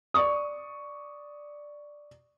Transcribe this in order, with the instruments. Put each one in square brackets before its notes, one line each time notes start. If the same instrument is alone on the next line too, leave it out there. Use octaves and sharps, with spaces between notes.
[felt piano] D5 C#6 D#6